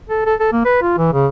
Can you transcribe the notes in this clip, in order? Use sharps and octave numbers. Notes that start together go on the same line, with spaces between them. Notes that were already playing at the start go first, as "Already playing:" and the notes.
A4
A4
A4
A#3
B4
F4
E3
C#3